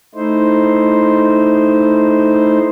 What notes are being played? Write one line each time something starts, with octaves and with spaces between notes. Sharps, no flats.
A3 D#4 E4 C5